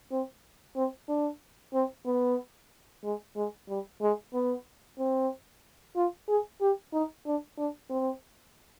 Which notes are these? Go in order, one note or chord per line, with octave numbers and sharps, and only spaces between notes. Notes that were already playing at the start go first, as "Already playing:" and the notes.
C4
C4
D4
C4
B3
G#3
G#3
G3
G#3
B3
C4
F4
G#4
G4
D#4
D4
D4
C4